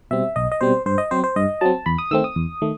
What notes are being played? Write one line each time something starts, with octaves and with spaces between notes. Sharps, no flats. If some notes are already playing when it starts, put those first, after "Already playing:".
B2 G3 C4 E5
B1 D#5
D#5
B2 G3 C4 C5
G2 C5
D#5
F#3 C4 C5
C5
G2 D#5
F#3 C4 A5
E2 B5
D#6
D#3 A3 C4 E6
D#6
E2
D#3 A3